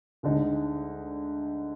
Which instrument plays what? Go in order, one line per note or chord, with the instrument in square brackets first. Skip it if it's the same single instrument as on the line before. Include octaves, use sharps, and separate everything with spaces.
[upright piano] D2 D3 G#3 D#4